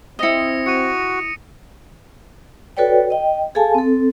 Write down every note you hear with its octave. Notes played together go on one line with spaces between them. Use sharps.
C4 E4 D#5 D#6 A#6 C#7
F#4 C#7 D#7
F#4 A4 B4 C#5 D5 G5
D#5 G5
G#4 A4 F5 G#5 A5
C4 A4